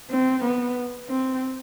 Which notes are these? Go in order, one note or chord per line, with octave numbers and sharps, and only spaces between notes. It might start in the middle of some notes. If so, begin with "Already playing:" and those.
C4
B3
C4